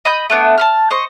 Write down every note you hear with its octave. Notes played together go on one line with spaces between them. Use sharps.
D#5 B5 D#6 G6
A3 B3 D4
A5 B5 F6
C5 D#5 C#6